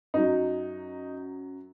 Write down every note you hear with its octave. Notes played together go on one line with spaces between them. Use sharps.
F#2 F#3 D#4